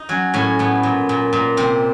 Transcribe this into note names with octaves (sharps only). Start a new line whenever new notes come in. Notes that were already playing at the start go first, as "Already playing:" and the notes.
Already playing: D#4
F#3 C#4
A2 C#4
A2 B3
A#2
A#2
A#2
C3 C4